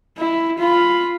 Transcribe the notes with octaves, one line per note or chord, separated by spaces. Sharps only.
E4
F4 B5